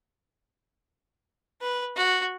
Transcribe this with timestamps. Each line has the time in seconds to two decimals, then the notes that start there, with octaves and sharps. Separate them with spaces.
1.62 B4
1.97 F#4